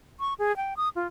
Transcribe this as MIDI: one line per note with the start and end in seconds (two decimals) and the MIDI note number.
0.20 0.34 85
0.39 0.55 68
0.57 0.74 79
0.77 0.89 87
0.96 1.07 65